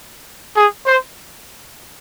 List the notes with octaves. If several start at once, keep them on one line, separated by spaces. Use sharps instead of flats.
G#4
C5